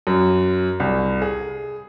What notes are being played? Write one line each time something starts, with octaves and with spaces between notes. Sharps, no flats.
F#2
C2
G#4